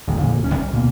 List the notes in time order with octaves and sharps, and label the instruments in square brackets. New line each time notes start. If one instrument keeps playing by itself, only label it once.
[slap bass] A1 E2 D3
F2 A#2 D3
D1 C#4
C2 G3
D2 B2 A#3